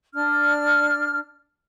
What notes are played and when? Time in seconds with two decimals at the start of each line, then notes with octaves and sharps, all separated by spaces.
0.14 D4 F6